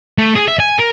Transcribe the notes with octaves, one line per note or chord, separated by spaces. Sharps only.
A3
G#4
E5
G#5
A#4